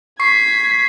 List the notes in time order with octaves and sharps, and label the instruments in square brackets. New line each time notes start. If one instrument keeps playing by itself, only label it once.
[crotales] C#6 C7 [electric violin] G#6 B6